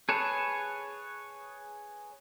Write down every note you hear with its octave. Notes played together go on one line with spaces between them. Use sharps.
G#4 B4 C#5 A5